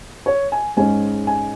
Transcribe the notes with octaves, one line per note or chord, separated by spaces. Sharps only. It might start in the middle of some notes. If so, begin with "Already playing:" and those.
C#5
G#5
G#2 G#3 C#4 G#5
G#5